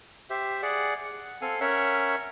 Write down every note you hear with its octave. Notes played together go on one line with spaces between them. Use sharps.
G4 C5 E5
G#4 D5 F#5
F#5
C4 A4 F5 G#5
C#4 A#4 C#5 E5 F#5